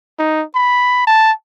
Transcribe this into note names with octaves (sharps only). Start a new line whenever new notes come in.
D#4
B5
A5